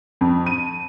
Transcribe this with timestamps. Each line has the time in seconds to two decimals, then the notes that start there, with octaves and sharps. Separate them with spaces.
0.21 F2
0.46 D#7